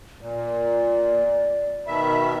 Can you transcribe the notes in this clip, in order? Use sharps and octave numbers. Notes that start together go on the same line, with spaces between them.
A#2 D5
B2 D#3 E5 B5